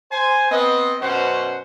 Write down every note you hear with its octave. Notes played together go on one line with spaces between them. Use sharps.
C5 G#5
B3 C4 D#5
F#2 B2 C#4 C5 F#5